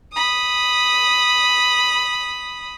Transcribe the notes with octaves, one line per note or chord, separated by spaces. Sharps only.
B5 D#6